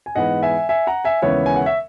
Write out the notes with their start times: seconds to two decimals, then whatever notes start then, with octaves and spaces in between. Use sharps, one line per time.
0.06 G#5
0.15 G#2 E3 G#3 B3 D#5 F#5
0.43 E5 G#5
0.69 E5 G#5
0.87 F#5 A#5
1.05 E5 G#5
1.22 D#2 C#3 E3 G#3 B3 C#5 E5
1.46 G#5
1.56 F#5
1.66 E5